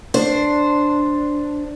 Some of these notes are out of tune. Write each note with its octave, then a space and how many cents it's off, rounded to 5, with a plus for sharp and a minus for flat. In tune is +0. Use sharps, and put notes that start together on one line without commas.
D4 +0 C5 +0